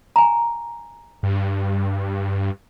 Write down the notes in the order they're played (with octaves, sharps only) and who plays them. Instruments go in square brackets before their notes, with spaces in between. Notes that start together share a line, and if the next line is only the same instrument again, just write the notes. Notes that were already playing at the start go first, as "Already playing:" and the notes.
[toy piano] G#5 A#5
[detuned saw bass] G2